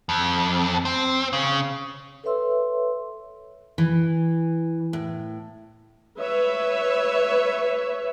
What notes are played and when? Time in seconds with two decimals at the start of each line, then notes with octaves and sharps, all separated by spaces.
0.09 F2
0.85 C4
1.33 C#3
2.24 A4 B4 C#5 E5 C6 E6
3.78 E3
4.93 A2
6.19 B4 C#5 E5